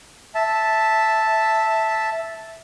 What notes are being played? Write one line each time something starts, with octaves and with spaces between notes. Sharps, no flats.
E5 A5